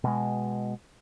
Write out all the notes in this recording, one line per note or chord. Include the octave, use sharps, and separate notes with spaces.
B2 G#3